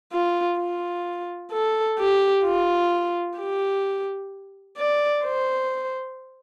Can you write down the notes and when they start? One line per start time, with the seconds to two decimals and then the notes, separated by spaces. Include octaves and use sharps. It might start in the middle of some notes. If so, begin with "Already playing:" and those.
0.13 F4
0.60 F4
1.52 A4
2.00 G4
2.45 F4
3.38 G4
4.78 D5
5.24 C5